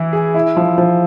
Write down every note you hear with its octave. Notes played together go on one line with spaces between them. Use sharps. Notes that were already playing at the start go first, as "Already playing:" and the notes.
Already playing: E3 E4
G#4
E4
F3
F3